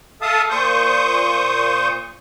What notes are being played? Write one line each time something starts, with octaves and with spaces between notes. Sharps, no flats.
A4 E5 F5 A5 D#6
A#2 C5 C#6 D#6 G6